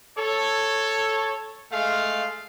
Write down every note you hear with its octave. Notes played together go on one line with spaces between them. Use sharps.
A4 C#5
G#3 A3 F5